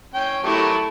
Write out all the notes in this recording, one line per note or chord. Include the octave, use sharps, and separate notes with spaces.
C#4 G5
F#3 A3 E4 G4 A#4